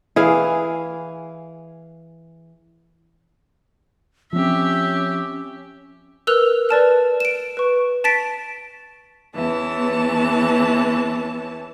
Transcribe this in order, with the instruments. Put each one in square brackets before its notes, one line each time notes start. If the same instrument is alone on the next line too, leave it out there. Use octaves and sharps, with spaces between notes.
[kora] E3 G#4 F5
[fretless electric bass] F3 C4 [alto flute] C#4 [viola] G4 E5
[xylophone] A#4 B4 E6 F#6 F7
B4 D5 A5 F6
D7 E7
B4 C#6
A5 A6 B6 D7
[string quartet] E2 E3 C#4 A5